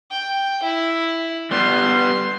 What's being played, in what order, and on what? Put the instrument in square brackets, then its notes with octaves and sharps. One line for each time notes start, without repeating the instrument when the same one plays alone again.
[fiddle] G5
E4
[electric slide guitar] G3 B3 [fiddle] C6